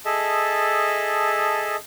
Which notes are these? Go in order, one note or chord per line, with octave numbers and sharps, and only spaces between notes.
G#4 A4 D#5 E5 A5